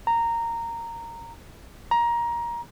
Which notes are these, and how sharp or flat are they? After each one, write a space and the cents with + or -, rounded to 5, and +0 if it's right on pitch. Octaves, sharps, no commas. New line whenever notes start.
A#5 -10
A#5 +20